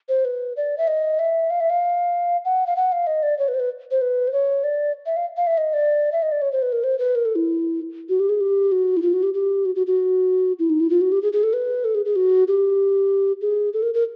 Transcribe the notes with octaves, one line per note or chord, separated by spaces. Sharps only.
C5
B4
D5
E5
D#5
E5
F5
E5
F5
F#5
F5
F#5
F5
D#5
D5
C#5
B4
C5
B4
C5
B4
C5
C#5
D5
E5
F5
F5
E5
D#5
D5
E5
D#5
D5
C#5
C5
B4
A#4
C5
B4
A#4
A4
E4
F#4
G4
G#4
G4
F#4
E4
F4
F#4
G4
G4
F#4
F#4
F#4
E4
D#4
E4
F4
F#4
G4
G#4
G#4
A4
B4
A4
G#4
G#4
F#4
G4
G#4
A4
A#4
A#4